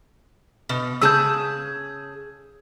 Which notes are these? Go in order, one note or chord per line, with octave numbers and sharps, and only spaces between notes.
B2
C#3 G#4 A5 E6 G6